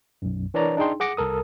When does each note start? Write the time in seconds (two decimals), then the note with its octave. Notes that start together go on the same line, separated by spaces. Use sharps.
0.22 B1 F#2
0.54 E3 D4 A#4 C#5 D5 A#5
0.77 D4 D#4 G#4 G5 C6
1.00 G#4 F#5 D6 A#6 C#7
1.17 C2 A4 A#4 D#6